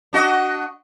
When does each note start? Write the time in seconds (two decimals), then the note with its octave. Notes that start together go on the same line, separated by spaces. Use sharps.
0.13 D4 F#4 D#5